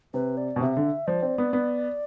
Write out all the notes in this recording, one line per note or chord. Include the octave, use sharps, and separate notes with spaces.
C3 B4
D5
B2
C3 E5
D3
F3 D5
C4
B3
B3